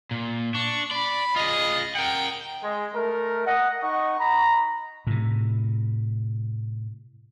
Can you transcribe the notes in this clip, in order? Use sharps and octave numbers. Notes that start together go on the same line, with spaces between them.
A#2
D4 C#6
D5 B5
F4 G#4 D#5
A#4 F#5 G5
G#3
A3 A#4
D#5 F#5
D#4 D#5 F#5 C#6
A#5 B5
A2 C3